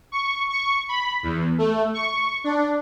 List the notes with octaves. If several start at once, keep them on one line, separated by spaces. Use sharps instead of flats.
C#6
C#6
B5
E2
A3
C#6
D4